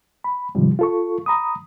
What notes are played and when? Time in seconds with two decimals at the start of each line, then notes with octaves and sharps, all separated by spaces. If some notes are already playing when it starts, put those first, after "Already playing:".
0.24 B5
0.55 G#2 C3 D#3 F3 G3
0.79 F4 A4 C#6
1.26 A#5 B5 D#6